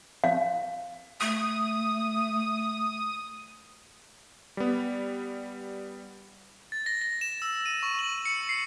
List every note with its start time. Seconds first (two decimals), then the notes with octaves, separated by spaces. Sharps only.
0.24 F5
1.21 A3 D#6
4.57 G3 B3
6.72 A6
6.86 A#6
7.01 A#6
7.21 E7
7.42 E6
7.66 D#7
7.83 C#6
7.99 F#7
8.26 C#7
8.49 C7